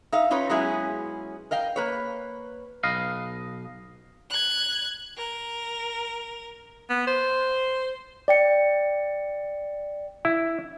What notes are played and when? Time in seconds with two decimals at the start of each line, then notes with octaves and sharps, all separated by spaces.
0.12 D#4 E5 F5
0.30 C#4 D#4 F4 B4 C#5
0.49 F#3 G#3 B3 C#4 E4 G#4
1.51 A#4 D#5 F5 G5
1.76 A#3 B4 C#5
2.83 B1 B4 D#5 F5
4.30 F#6 G#6
5.17 A#4
6.90 B3
7.07 C5
8.28 D5 G5 C#7
10.25 E4